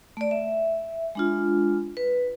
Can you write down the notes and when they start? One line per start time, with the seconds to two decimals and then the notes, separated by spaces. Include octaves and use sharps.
0.17 A3 D5
0.31 E5
1.15 G#3 D4 F4
1.97 B4